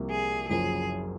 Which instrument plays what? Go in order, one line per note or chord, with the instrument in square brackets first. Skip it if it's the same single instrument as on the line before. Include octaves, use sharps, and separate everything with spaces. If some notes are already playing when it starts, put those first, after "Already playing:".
Already playing: [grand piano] C2 C3 F3 A#3
[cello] G#4
[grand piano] F#1 F#2 F3 [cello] G#4